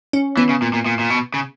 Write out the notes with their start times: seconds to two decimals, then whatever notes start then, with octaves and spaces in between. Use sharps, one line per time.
0.13 C#4
0.37 E3 B3
0.49 C#3
0.62 A#2
0.73 A#2
0.86 A#2
0.99 A#2
1.10 B2
1.34 C#3